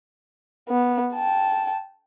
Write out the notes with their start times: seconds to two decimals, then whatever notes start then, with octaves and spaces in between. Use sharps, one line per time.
0.69 B3
1.14 G5 A5